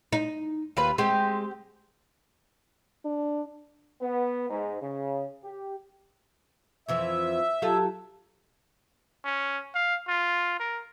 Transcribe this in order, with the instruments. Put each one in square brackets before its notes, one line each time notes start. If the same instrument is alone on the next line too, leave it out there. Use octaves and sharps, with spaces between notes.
[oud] D#4
[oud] D#2 [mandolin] F4 B4
[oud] G#3 [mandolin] C4 G4
[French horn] D4
[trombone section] B3
G#2
C#3
G4
[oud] F2 E3 F3 [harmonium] E5
[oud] F#3 F4 A4 [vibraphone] G4 A5
[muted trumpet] C#4
F5
F4
A#4